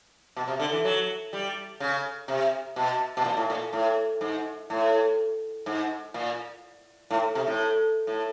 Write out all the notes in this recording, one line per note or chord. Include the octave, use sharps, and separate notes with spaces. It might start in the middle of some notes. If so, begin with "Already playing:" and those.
B2
C3
D3
E3
F#3
G3
C#3
C3
B2
B2
A#2
A2
A#2
A2
G#2
A2
G#2
A#2
A2
C3
A2
A2